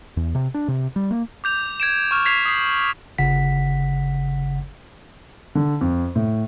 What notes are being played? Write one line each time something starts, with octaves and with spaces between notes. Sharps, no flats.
E2
C3
D4
C3
G3
A#3
D6 G6 F7
G#6 D7 E7
C#6 F6
G#6 B6 C7 F7
D#6 C7
G1 C#3 F#5 B6
D3
F2
A2